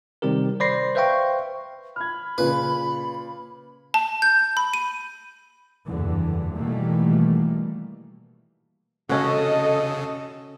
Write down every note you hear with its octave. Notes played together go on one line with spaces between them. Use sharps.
C3 D#3 G3 C4 G4 A#4
C5 D5 B5 C6 A#6 C7
B4 C5 E5 F5 G5 C#6
B5 F6 G#6
A#2 C#3 B4
A5
G6
B5
D#7
F#1 E2 G2 D3 E3
B2 D#3 E3 G3 A3 A#3
C#3 C#4 F#4 A4 D#5